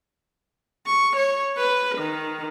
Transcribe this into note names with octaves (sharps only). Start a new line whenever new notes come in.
C#6
C#5
B4
D#3